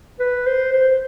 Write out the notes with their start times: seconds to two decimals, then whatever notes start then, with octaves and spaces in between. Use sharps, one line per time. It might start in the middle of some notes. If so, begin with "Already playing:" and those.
0.20 B4
0.46 C5
0.72 C5